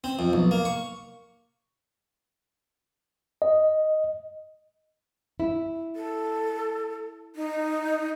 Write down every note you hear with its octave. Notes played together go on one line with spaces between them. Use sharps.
C4
F2
B1
A#3
C#6
D#5
E4
A4
D#4